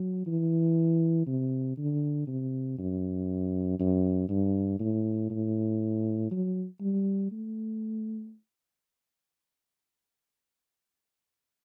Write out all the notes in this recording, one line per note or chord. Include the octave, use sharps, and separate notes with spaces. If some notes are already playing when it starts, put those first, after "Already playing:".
Already playing: F#3
E3
C3
D3
C3
F#2
F#2
G2
A2
A2
F#3
G3
A3